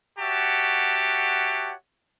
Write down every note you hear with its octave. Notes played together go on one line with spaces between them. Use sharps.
F#4 G4 C#5 E5 F#5 A5